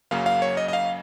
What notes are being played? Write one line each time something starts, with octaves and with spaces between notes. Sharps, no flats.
F#2 C#3 F#3 A#3 C#4 F5
F5
C#5
D#5
D#5
F5